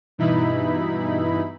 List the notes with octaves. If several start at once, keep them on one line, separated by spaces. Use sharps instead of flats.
G2 B2 E3 D#4 E4 B5